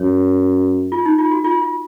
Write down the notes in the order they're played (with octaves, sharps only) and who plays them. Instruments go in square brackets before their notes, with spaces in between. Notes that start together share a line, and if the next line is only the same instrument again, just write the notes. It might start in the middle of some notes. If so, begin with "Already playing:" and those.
Already playing: [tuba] F#2 [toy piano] C#5
[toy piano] F4
D#4
F4
F#4
F4
F4